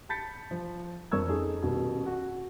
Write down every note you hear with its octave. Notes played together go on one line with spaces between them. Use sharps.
A5 B5 G6 A6 B6 C#7
F3
F2 F3 A#4 C#6 E6 G#6
C#4 D#4 G#4 A4
D#1 B2
F#4